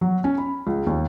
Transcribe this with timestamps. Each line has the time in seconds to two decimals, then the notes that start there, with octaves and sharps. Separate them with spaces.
0.01 F#3
0.24 C#4
0.38 B5
0.67 C#2
0.87 D#2